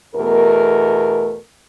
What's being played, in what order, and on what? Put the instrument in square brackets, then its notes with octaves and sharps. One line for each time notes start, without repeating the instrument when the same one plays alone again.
[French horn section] E2 B2 A3 A#4